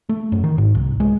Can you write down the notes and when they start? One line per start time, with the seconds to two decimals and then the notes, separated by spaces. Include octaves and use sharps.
0.09 A3
0.32 F#2
0.44 D#3
0.58 G#2
0.75 C2
1.00 G#3